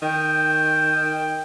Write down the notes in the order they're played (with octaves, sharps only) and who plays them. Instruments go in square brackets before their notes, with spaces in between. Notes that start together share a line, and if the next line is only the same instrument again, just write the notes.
[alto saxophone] D#3 [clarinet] G5